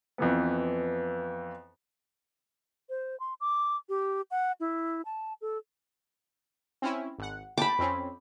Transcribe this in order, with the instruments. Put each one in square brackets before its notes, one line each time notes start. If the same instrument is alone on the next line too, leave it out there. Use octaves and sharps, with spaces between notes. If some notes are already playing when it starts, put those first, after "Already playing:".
[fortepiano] F2 E3 B3
[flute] C5
C6
D6
G4
F#5
E4
A5
A4
[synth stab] C4 C#4 E4
G#1 F#5
[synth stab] G5 A5 [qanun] B5 D6
[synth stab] F2 C4 C#4